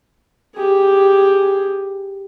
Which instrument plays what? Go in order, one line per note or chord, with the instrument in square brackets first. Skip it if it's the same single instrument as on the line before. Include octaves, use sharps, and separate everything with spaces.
[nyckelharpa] G4 G#4